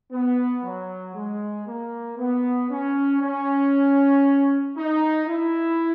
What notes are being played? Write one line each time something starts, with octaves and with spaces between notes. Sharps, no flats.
B3
F#3
G#3
A#3
B3
C#4
C#4
D#4
E4